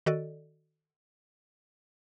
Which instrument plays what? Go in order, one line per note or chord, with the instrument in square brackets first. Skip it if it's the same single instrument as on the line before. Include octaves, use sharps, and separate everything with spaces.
[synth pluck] D#3 F#4 A4 D5 D#5